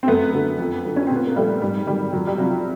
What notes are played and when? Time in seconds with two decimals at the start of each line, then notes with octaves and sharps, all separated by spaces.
0.03 C4
0.07 F#2 A3 B3
0.32 D3 F#3
0.59 F2
0.85 D3 F#3
0.96 C#4
1.07 A#2 C4
1.16 B3
1.27 A#3
1.36 F3 G3 A3
1.62 G#2 G3
1.87 D#3 F#3 G3
2.13 F2 F#3
2.27 G3
2.38 C3 F3 F#3